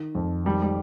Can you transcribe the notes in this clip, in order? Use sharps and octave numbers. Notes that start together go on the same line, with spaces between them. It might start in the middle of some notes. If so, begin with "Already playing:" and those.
Already playing: D#3
F2
D#3 G3
G3